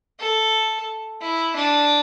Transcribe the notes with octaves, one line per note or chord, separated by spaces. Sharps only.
A4
E4
D4